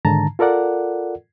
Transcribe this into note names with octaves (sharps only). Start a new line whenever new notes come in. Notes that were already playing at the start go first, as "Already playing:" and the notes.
G#2 D3 D#3 A5 A#5
F4 A4 A#4 D5 F#5